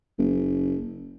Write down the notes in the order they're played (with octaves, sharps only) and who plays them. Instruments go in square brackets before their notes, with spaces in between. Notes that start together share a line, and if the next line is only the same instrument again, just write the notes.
[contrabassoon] F#1